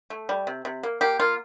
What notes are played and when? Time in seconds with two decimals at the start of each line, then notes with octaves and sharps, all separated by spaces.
0.10 A3
0.29 G3
0.47 C3
0.65 C3
0.83 A#3
1.01 A#3 G4
1.19 A#3 F4